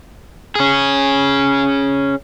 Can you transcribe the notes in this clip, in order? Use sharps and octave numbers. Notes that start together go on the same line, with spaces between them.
C#4 G#4